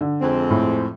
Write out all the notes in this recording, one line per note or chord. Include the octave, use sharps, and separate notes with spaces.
D3
F2 G#3 C4
A2